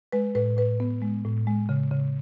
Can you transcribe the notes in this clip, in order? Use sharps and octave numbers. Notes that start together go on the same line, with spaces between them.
G#3 B4
A2 B4
A2 B4
B3
G#3
A2
G#3
C#3
C#3